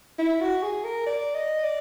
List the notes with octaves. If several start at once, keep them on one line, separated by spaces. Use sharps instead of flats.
E4
F#4
G#4
A#4
D5
D#5
D5